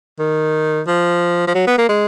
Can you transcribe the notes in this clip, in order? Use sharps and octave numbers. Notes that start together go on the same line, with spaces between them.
D#3
F3
F3
F#3
B3
A#3
G#3